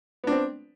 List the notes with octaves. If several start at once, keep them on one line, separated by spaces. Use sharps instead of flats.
B3 C4 D4